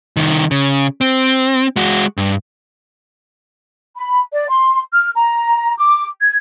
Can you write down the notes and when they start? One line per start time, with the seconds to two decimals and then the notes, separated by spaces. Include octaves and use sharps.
0.17 C2 D#3
0.51 C#3
1.01 C4
1.76 G#3 F#4
2.17 G2
3.97 B5
4.33 D5
4.50 C6
4.93 F6
5.16 A#5
5.78 D6
6.22 G#6